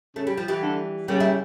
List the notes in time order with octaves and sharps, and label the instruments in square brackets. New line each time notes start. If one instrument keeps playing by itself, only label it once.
[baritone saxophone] C#3 [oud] A3
[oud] G3
F3
E3 G3
[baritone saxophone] D3
[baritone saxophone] C#3 [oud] G3 A#3
[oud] E4